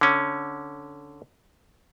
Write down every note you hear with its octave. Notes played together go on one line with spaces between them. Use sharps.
D3 C#4